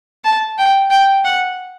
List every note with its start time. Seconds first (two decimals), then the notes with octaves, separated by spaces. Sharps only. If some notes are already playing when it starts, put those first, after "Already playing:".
0.24 A5
0.58 G5
0.90 G5
1.25 F#5